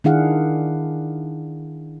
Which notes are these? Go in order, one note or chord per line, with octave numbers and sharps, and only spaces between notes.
D#3 D4 E4 G#4 F5 F#5